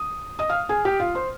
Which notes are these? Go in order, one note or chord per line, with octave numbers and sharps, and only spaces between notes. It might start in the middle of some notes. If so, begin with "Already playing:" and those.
Already playing: D#6
D#5 D#6
F5 F6
G#4 G#5
G4 G5
F4 F5
C5 C6